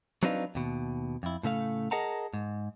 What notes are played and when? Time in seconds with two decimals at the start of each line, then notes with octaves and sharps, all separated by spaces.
0.23 F#3 C4 D4 D#4 B4 F5
0.55 D#2 B2
1.23 F2 E4
1.43 A2 C#3 A3 F5
1.91 G#4 A#4 D#5 F#5 A5 A#5
2.34 G#2